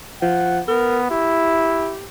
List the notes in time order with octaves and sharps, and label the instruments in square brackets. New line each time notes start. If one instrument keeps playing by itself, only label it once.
[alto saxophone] F3 [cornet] F#5
[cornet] B3 [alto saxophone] A#4
[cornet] E4 [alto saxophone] G4